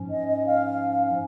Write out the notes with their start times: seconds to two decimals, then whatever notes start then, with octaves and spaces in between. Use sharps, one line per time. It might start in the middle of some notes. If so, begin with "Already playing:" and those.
Already playing: G#2 F3 C#4
0.10 D#5
0.28 D#5
0.46 F5
0.66 F5
0.91 F5
1.07 F5